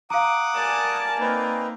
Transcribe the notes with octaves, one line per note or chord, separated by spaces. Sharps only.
F5 F#5 A#5 D6 D#6
A#4 D5 G#5 A5
A#3 C4 D#4 B4